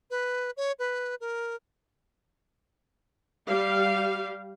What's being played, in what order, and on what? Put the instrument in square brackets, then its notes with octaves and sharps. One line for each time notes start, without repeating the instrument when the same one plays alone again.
[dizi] B4
C#5
B4
A#4
[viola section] G3 G4 F5